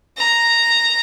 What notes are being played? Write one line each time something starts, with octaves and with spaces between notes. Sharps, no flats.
A#5